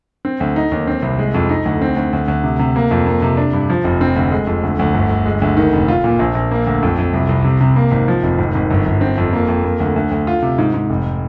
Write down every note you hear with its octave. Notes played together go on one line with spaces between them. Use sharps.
C4
D2
D#4
D#2
C4
C2
G#3
F2
D#4
D2
C4
D2
D2
D2
C3
C3
A#3
F2
A#3
C3
D4
G2
F3
F1
C4
D2
G#3
F2
D2
D2
G1
G1
G#3
D2
D#3
F1
F4
A#2
A#1
A#1
A#3
D2
F2
F2
C2
C2
C3
C3
A#3
G#1
F3
F1
G#1
G#1
G1
G1
C4
F2
A#3
F2
A#3
D2
D2
D2
F4
C3
G#2
G#2
F1